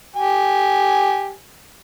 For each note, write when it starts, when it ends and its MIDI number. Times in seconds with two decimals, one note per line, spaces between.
0.16 1.32 67
0.16 1.32 80